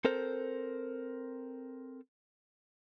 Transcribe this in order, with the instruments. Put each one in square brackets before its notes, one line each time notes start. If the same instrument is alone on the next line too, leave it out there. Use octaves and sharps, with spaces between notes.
[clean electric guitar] C4 A4 A#4 C5